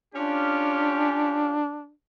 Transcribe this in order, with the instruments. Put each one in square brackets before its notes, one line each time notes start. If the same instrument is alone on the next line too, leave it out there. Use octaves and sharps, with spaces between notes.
[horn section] C#4 F4 G4 [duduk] D4